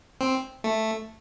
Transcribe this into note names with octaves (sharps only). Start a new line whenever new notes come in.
C4
A3